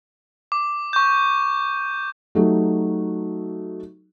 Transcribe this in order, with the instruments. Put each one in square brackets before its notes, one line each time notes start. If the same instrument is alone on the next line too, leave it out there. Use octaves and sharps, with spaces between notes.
[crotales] D6
C#6 G6
[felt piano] F#3 A3 D#4 F#4 G4